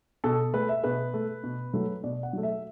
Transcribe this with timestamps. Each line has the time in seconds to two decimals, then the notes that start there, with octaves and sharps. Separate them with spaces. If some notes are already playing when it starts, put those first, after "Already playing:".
0.24 B2 A4
0.54 A3 B4
0.69 E5
0.84 B2 B4
1.14 A3
1.44 B2
1.74 F#3 A3
2.04 B2 D5
2.23 F#5
2.33 F#3 A3
2.43 E5